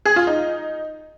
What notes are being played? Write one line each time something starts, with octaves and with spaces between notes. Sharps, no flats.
G#4
F4
D#4